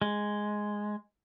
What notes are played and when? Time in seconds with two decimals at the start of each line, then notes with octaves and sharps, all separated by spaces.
0.02 G#3